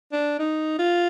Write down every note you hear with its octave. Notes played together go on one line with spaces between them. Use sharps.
D4
D#4
F4